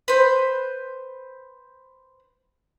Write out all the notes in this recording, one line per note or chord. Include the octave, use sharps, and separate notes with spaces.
B4 C5